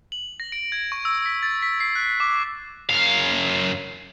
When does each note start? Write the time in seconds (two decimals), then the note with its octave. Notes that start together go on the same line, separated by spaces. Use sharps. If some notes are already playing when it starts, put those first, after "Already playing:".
0.12 F#7
0.40 A#6
0.52 D7
0.72 G#6
0.92 C#6
1.05 E6
1.26 B6
1.43 A6
1.62 B6
1.80 C7
1.95 F#6
2.20 D6
2.90 F#2 F5